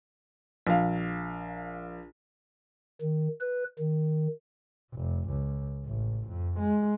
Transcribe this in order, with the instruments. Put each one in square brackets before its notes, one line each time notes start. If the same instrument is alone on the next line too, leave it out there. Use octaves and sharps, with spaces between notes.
[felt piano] A#1 F5
[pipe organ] D#3
B4
D#3
[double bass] F1
C#2
A1
F2
G#3